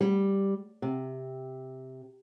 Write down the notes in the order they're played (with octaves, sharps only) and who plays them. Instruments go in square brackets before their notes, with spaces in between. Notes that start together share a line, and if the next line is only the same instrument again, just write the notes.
[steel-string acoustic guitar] G3
C3